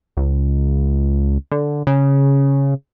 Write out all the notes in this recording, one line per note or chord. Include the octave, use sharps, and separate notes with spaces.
C#2
D3
C#3